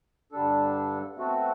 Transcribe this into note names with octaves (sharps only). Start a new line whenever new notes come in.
G2 D3 G3 D4 A4
B2 A3 C4 F#4 A4